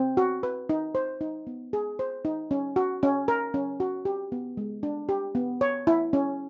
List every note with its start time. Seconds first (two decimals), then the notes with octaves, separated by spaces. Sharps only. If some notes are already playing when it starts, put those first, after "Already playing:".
Already playing: C4
0.17 F#4
0.43 B4
0.69 D#4
0.95 C5
1.21 D#4
1.47 B3
1.73 G#4
1.99 C5
2.25 D#4
2.51 C#4
2.76 F#4
3.03 C#4
3.28 A#4
3.54 C#4
3.80 F#4
4.05 G4
4.32 B3
4.57 G#3
4.83 D4
5.09 G4
5.35 B3
5.61 C#5
5.87 E4
6.13 C#4